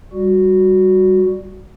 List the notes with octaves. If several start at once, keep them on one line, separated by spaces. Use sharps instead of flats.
G3 F#4